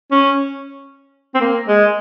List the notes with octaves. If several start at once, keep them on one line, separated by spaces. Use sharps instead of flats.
C#4
C4
A#3
G#3